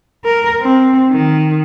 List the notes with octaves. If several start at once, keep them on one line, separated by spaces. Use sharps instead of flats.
A#4
C4
D#3